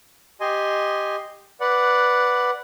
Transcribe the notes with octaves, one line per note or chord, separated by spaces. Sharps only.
G4 D#5 G#5 C6
B4 D5 F#5